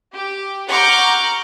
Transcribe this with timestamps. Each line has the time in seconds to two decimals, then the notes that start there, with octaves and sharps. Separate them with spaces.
0.15 G4
0.71 F#5 A#5 C#6 D6 F6 G6